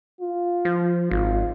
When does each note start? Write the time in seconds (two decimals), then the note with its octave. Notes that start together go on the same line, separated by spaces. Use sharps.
0.21 F4
0.65 F3
1.11 G#1 F4